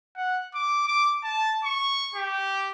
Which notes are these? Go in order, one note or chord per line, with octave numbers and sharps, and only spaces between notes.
F#5
D6
D6
A5
C#6
G4